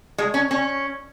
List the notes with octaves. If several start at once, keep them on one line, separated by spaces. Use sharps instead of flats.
G#3
C#4
C#4